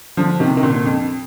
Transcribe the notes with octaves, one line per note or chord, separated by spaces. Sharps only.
D3 F3
C3 D#3
D#3
A#2 D3
F2